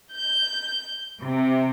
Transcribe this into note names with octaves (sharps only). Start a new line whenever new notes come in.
G6
C3